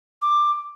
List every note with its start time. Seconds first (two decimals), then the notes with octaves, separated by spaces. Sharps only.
0.21 D6